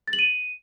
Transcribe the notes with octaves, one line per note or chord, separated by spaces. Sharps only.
A6
F#7
D#7